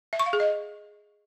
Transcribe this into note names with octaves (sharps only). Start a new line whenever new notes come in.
E5
C#6
F5
G#4
D#5